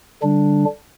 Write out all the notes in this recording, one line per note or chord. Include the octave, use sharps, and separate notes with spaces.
D3 G3 D4